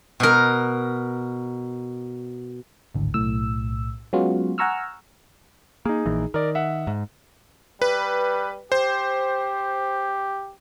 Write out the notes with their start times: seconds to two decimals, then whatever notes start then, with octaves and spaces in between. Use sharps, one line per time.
0.20 B2 A#4
2.95 G#1 D2 A2
3.14 B1 A2 E6
4.13 F#3 G#3 B3 C#4 F4 F#4
4.58 F#5 G#5 A#5 C#6 E6 F6
5.85 A#3 D#4 G#4
6.06 A#1 E3 A#3
6.34 D#3 A#4 D5
6.55 E5 F#5
6.87 G#2
7.82 G3 B4
8.72 G4 C5